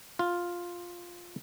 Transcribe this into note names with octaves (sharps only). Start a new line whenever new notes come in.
F4